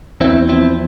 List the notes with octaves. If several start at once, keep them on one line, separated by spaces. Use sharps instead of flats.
E2 C4 E4
F3 C4 E4